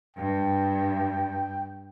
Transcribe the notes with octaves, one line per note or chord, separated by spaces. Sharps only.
G2 G5